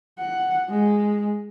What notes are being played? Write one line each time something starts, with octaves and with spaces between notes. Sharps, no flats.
F#5
G#3